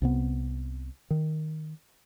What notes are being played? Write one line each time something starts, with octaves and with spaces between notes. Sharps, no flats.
C2 C3 B3
D#3